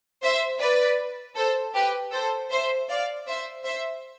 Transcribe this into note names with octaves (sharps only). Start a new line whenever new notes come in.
C5 E5
B4 D5
A4 C5
G4 B4
A4 C5
C5 E5
D5 F5
C5 E5
C5 E5